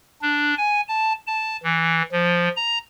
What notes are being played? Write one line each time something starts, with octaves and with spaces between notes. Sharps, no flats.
D4
G#5
A5
A5
E3
F3
A#5